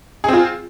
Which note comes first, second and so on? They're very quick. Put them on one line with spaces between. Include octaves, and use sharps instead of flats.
G#4 C4 F4